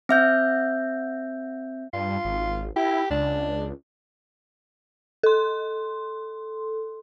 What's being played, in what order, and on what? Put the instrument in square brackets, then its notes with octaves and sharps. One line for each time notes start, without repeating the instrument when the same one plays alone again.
[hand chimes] C4 E5 G6
[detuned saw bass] G2 [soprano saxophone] F4
[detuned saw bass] G#1
[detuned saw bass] E4 [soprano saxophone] G4
[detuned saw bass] C#2 [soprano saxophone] D4
[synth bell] A4 C6